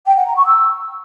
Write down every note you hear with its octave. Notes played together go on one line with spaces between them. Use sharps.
G5
F#5
A#5
C#6
E6